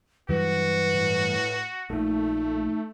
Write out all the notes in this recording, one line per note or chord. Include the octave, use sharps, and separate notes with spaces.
G2 E3 F#3 F#4 B4
A2
A#1 A#2 A3 D#4